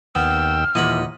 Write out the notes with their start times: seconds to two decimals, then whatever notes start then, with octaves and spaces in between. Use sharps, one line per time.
0.15 D#2 B3 G5 E6 F6
0.75 D#2 A#2 E3 D#5 F#5 B5